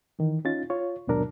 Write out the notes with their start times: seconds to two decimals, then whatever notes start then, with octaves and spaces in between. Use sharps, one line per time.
0.19 D#3 E3
0.45 C#4 D#4 F4 A6
0.70 F4 C#5
1.07 D#2 G#2 B2 F#3 D4 A#4